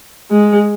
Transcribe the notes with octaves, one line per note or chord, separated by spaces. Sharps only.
G#3